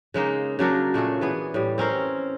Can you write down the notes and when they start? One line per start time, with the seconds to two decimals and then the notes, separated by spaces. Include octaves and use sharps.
0.14 C#3 G#3 A#3 D#4
0.59 C#3 F#3 D4 A#4
0.94 A#2 A3 F#4 G#4
1.21 E3 B3 G#4
1.54 A2 G3
1.78 C4 C#4 A#4 C5